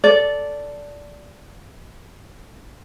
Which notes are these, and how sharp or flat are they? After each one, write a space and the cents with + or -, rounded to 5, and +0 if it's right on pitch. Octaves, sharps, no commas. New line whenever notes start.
A4 +5 D5 -10